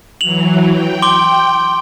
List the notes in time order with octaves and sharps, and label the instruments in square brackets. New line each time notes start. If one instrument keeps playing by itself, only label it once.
[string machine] E3 F#3 [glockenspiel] F7 F#7
[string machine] G5
[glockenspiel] C6 D6 G7